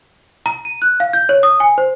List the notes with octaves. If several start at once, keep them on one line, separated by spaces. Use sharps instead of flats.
A#5
D#7
F#6
F5
G6
C#5
D#6
G#5
C5